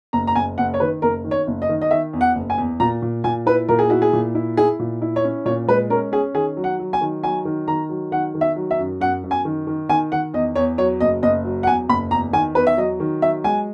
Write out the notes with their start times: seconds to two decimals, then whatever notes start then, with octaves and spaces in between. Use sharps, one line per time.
0.13 F#1 A#5
0.27 A#5
0.35 F#1 G#5
0.58 F#1 F#5
0.74 C#5
0.80 D#3 B4
1.02 F#1 A#4
1.24 D#3
1.31 C#5
1.47 F#1
1.62 D#5
1.69 D#3
1.82 D#5
1.91 D#3 E5
2.13 E2
2.21 F#5
2.35 F#1
2.50 G#5
2.58 E2
2.80 A#2 A#5
3.02 A#2
3.24 A#2 G#5
3.46 E4 B4
3.68 A#2 A#4
3.79 G#4
3.90 E4 F#4
4.02 G#4
4.13 A#2
4.35 E4
4.57 E4 G#4
4.79 A#2
5.02 E4
5.16 C#5
5.24 C#4
5.45 A#2 C#5
5.68 G#3 B4
5.90 C#4 A#4
6.12 C#4 G#4
6.34 D#3 G#4
6.57 F#3
6.64 F#5
6.80 F#3
6.93 G#5
7.01 D#3
7.23 F#3 G#5
7.45 D#3
7.68 D#3 A#5
7.89 F#3
8.11 D#3 F#5
8.35 D#3
8.41 E5
8.56 F#3
8.71 E5
8.79 F#2
9.00 F#2 F#5
9.24 F#2
9.31 G#5
9.45 D#3
9.67 D#3
9.89 D#3 G#5
10.12 D#3 F#5
10.34 E2 D#5
10.56 E2 C#5
10.78 F#3 C#5
11.01 F#1 D#5
11.22 F#1 D#5
11.45 F#3
11.63 F#5
11.67 E2 G#5
11.89 F#1 B5
12.11 E2 A#5
12.33 D#3 G#5
12.55 E2 B4
12.67 E5
12.77 F#3 D#5
13.00 D#3
13.22 F#3 E5
13.44 G#3 G#5